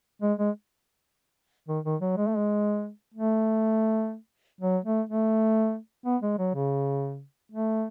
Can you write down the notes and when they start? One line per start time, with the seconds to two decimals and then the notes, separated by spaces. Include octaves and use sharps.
0.22 G#3
0.39 G#3
1.68 D#3
1.85 D#3
2.01 F#3
2.17 G#3
2.27 A3
2.37 G#3
3.14 A3
4.61 F#3
4.85 A3
5.09 A3
6.05 B3
6.22 G#3
6.38 F#3
6.54 C#3
7.52 A3